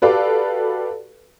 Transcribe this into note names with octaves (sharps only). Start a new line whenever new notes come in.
F#4 G4 A4 B4 D5 F5